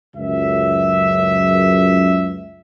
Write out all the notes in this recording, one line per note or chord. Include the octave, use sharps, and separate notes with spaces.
C#2 F#2 E5